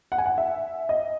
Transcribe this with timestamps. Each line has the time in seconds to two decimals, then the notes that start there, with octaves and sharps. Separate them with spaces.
0.12 F#5
0.18 G#5
0.26 F#5
0.38 E5
0.89 D#5